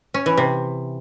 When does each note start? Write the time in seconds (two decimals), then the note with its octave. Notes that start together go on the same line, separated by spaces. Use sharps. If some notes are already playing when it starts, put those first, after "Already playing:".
0.14 C#4
0.26 E3
0.37 C3